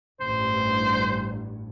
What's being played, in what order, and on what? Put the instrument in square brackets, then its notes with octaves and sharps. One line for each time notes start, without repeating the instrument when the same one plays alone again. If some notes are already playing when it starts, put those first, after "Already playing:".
[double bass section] A1 G2 [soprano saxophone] C5